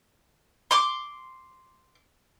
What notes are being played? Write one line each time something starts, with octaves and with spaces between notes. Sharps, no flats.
C6 D6